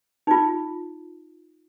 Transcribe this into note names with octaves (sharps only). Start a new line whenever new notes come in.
D#4 F4